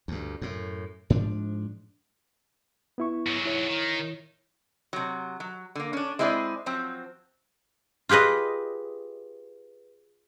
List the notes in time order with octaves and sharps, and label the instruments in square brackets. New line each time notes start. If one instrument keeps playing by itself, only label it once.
[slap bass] D2 G2
F#2 A2
G#2 F3 D4
[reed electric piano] B3 E4 C#6
[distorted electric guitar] G#2 F#3
[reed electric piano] E4 C#5
[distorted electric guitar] D#3
[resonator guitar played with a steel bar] C3 F#3
F#3
D3 A#3
C#4 D4
G#3 C4 E4 G#4 A#4 D5
F3 F#3 C4
[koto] F4 G4 G#4 B4 D#5